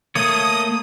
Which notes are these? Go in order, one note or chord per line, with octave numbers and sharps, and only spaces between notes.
A3 A#3 C#5 D#6